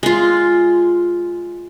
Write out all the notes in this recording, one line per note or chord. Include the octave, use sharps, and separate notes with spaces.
G#3 F4